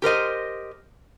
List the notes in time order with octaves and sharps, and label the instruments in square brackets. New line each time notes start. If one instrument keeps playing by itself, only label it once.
[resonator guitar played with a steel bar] G4 A#4 C5 D#5